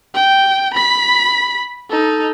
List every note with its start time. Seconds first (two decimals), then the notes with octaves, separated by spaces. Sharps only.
0.14 G5
0.74 B5 B6
1.90 D#4 A4